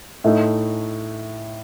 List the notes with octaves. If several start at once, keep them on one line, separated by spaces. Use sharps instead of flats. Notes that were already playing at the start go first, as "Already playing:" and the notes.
A2 A3 D#4